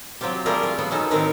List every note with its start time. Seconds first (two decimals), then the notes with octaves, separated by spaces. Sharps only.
0.21 F#3 C4 F4 G4
0.46 G3 A3 F4 G4 G#4 A#4
0.63 F4
0.78 F#3 B3
0.91 B3 C#4 D#4 A4
1.11 A2 D#3 C4 A#4 B4